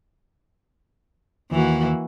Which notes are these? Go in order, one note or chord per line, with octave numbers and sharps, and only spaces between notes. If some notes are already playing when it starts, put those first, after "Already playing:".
D#2 E3 A#3 F#4